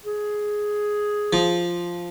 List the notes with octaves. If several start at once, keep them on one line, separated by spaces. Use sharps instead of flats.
G#4
F3